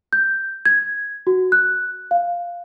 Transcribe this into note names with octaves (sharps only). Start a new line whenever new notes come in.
G6
G#6
F#4
F#6
F5